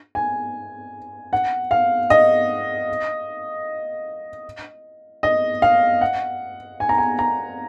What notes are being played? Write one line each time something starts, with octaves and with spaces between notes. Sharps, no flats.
G#5
F#5
F5
D#5
D#5
F5
F#5
G#5
A#5
G#5
A#5